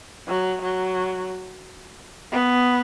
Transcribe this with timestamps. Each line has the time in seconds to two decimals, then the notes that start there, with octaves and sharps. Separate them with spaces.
0.27 F#3
0.62 F#3
2.32 B3